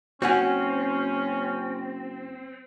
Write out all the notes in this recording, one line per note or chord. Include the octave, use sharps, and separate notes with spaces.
F#1 C4 C#4 F#4 F#5 G#5